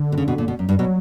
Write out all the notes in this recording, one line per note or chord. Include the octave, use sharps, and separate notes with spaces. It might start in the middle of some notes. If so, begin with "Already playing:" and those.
Already playing: D3
B2
C#3
B2
A#2
B2
F#2
G2
B2 F#3